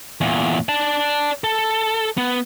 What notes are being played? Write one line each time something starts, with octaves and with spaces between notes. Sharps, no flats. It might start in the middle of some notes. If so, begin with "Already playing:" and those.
E2 A#2
D5 A5
A4
B3